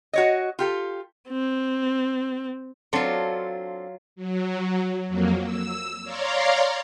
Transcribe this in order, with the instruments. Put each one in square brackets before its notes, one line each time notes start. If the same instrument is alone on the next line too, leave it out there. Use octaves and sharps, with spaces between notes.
[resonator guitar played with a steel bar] F#4 C#5 D#5
F4 G4 A4
[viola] C4
[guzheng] F#3 F4 [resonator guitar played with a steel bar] C4 D4 A4
[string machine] F#3
F2 F#3 A#3
E6
C#5 D5 F5 A#5 C6